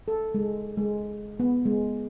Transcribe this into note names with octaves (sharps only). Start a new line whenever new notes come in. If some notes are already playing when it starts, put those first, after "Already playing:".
A4
G#3
G#3
B3
G#3